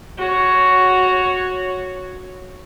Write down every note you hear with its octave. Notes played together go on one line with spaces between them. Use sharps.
F#4 C#5